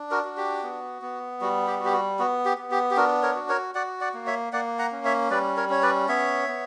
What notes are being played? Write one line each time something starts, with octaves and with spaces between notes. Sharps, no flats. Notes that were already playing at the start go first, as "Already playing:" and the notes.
Already playing: D4
F#4 A#4
F#4
G4
B3
B3
G3 F#4
G4
F#4
G4
F#4
B3 F#4
G4
B3
G4
G4
D4 F#4 A#4
A#4 C#5
F#4
A#4 C#5
F#4 D5 F#5
D5 F#5
A#3
C#5 E5
A#3 D5 F#5
F#5 A#5
C#4
C#5 E5
G3 B4 D5
A#4 C#5
C#4 C#5
B4 D5
B3 C#5 E5
B3